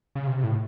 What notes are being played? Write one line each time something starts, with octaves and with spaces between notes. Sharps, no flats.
C#3
C3
A2